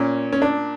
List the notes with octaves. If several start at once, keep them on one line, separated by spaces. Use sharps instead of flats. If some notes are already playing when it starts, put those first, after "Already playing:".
Already playing: A#2 C#4
C#4
D4